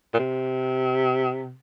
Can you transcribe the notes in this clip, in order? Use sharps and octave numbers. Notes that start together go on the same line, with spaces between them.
A#2
C3